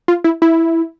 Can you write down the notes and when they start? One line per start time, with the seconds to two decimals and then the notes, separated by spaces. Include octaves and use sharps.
0.08 F4
0.24 E4
0.42 E4